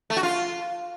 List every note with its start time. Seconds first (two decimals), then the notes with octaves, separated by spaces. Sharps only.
0.10 A3
0.17 F#4
0.23 F4